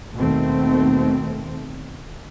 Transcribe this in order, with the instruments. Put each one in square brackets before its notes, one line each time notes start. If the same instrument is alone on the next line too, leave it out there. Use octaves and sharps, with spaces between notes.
[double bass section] D#2 B2 D#3 A3 C4